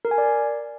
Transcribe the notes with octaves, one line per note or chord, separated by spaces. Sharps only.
A#4
G#5
D5